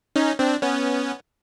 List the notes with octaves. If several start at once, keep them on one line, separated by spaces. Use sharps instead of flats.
C#4 D#4
C4 D4
B3 C#4